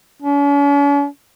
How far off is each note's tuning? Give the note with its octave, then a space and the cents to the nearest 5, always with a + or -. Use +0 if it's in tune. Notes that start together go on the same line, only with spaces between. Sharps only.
C#4 +45